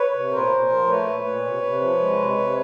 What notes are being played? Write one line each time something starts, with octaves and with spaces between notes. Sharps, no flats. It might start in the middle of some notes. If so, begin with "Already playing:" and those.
Already playing: B4 C#5
C3
A#2 A#4 C5
A#2
F3
A3 B4 C#5
A#2
A#2
C3
C3
F3
G#3
C3
C3